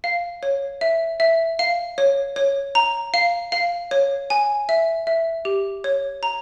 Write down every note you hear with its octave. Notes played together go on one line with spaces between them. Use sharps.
F5
C#5
E5
E5
F5
C#5
C#5
A#5
F5
F5
C#5
G#5
E5
E5
G4
C#5
A#5